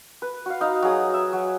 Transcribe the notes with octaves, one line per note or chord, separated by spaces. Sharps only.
B4
F#4 F5
D#4 F5
F#3 G#4 D#6
E5
F#3